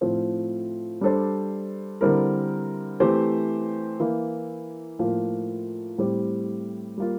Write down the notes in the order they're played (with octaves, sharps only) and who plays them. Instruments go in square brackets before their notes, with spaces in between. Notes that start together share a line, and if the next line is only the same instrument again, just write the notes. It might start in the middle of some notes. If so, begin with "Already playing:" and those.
[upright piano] A2 F3 C4
G3 D4 A4 C5
D3 G3 C4 E4 A#4
E3 A3 C4 G4 C5
E3 A#3 E4
A2 F3 A#3 F4
A2 G3 C4 G4
G3 A#3 F4